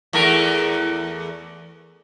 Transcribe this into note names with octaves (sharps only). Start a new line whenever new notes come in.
E2 A3 A#4